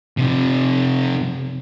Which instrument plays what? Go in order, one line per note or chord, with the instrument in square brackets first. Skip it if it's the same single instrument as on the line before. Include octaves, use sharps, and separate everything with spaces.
[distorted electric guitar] F2 C3